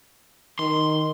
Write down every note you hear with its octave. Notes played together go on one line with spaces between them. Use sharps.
D#3 C6